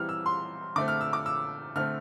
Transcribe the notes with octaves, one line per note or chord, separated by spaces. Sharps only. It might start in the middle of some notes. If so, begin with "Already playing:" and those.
Already playing: E3 G3 C4 F6
E6
C6
D3 A3 C4 D6
F6
E6
D6
E6
D3 A3 C4 F6